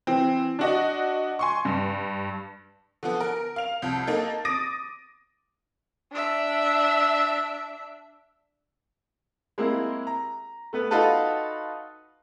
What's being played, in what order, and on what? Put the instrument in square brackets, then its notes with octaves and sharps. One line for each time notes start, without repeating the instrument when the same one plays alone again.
[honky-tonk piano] E3 C4
D4 F#4 D#5
G#5 C6 C#6
G2
D3 F3 B3
A#4
F5 F7
C2 F2
A#3 D#4 A4
D6 D#6 A6 A#6 D7 D#7
[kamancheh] D4 E5
[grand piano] G#3 A#3 C4 E4
A#5
A3 B3 B4
D#4 F4 F#4 A4 B4 A5